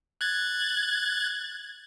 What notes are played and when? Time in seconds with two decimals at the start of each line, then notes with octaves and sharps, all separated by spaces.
0.21 F#6 G#6 A6